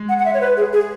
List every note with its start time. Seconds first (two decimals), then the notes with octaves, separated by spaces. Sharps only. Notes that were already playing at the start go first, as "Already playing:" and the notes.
Already playing: G#3
0.09 F#5
0.19 F#5
0.25 E5
0.34 C#5
0.41 B4
0.57 G#4
0.73 G#4